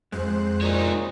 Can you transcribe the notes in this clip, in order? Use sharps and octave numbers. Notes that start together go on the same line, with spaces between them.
F2 G#2 G#3 C5 F#6
A#2 D#4 C#5